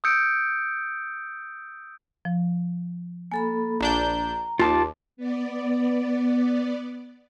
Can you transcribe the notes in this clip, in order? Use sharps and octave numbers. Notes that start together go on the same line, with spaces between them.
D#6 E6 G6 C#7 D7
F3
A#3 A4 G#5 B5
A#1 D4 A#5 G6
D#2 F4 A5 D6
B3 D5